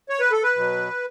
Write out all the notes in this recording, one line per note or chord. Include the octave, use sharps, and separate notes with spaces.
C#5
B4
A4
B4
B2 F#3